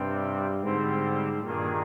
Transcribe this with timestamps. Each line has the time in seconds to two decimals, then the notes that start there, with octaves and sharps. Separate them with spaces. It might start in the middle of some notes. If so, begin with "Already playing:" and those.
Already playing: G2 C3 G3 C4 G4
0.63 G#2 D3 G3 C4 G4 C5
1.45 G2 A#2 D#3 A#3 D4 G#4